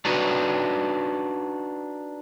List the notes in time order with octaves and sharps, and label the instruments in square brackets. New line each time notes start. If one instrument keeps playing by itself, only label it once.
[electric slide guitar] D4 D#4 F#4 B4